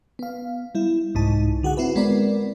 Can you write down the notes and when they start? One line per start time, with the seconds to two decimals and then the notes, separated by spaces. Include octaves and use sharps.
0.19 B3 F5
0.75 G3 E4
1.15 C2 G#2 D#4 A5
1.63 D3 F#4 G#4 F#5
1.77 C4 E4 F#4 B4
1.95 G#3 B3 C4 A#4 B4 D5